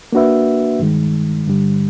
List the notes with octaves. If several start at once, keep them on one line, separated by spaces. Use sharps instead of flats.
A#3 D4 F#4 B4 E5
G2 D#3 G#3
G2 D3 G3